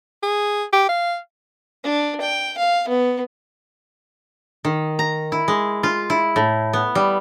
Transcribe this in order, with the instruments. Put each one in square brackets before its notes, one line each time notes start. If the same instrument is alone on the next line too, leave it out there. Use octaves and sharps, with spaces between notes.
[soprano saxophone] G#4
G4
F5
[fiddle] D4
G5
F5
B3
[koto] D#3
A#5
E4
G#3
F4
E4
A2
B3
G3